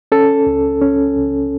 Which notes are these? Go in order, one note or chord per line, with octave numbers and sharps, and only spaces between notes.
C#4 A4
C#2
C#4
C#2